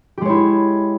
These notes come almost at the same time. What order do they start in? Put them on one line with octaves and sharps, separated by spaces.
G4 G#3 C#5 E4